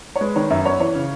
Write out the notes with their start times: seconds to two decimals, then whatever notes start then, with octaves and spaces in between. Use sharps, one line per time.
0.16 C#5
0.21 G#3 B4
0.36 D#3 C#5
0.50 F#2 E5
0.65 B3 C#5
0.80 E3 C#5
0.95 C#3